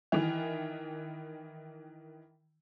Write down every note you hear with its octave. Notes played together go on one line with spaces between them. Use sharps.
D#3 E3